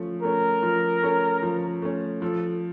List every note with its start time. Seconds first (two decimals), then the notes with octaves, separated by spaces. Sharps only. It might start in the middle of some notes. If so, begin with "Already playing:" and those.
Already playing: F3 A3 C#4
0.23 A3 C#4 A#4
0.63 F3
1.03 A3 C#4
1.43 F3
1.82 A3 C#4
2.21 F3 A4